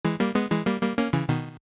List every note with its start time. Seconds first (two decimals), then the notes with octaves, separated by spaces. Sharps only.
0.05 E3 G#3
0.20 G3 A#3
0.35 G#3 B3
0.51 E3 G#3
0.66 G3 A#3
0.82 G3 A#3
0.98 A#3 C#4
1.13 C#3 E3
1.29 B2 D#3